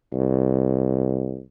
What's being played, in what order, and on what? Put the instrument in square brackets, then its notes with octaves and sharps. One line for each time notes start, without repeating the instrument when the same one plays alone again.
[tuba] C2